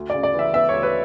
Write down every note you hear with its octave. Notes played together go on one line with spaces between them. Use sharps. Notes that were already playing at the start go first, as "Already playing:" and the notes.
Already playing: D2
D5
C#3
D5
E3
E5
B3 E5
C#5
D2
B4